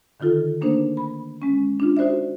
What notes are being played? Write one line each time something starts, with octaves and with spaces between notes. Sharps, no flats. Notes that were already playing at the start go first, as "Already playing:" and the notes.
D3 D#3 D#4 F4 A4
A3 A#3 D4 D#4 A#4 C5
B5
G#3 C#4
D4 F4
D#4 F#4 C5 D5 E5